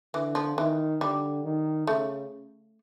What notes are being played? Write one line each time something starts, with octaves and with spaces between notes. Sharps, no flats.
D3 E3
F3
D#3 E3
D3 G3
D#3
C#3 A3